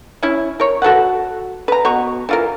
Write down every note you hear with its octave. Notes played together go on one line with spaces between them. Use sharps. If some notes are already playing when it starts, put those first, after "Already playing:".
C#4 E4
A#4 C#5
F#4 A4 B4 F#5
B4 A#5
B2 A#5 C#6
E3 F4 A#4